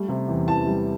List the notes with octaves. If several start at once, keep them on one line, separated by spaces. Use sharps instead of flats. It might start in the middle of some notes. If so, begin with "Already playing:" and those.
Already playing: G3 A3
C3
E2
E3 A5
G3